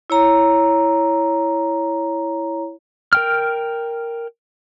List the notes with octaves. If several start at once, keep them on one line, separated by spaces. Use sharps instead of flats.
E4 C#5 A#5
A#4 G5 F6